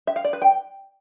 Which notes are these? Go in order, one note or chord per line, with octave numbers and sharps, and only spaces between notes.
E5
F5
D5
B4
G5